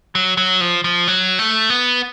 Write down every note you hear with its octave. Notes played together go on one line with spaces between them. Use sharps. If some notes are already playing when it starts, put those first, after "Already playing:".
F#3
F#3
F3
F3
F#3
A3
B3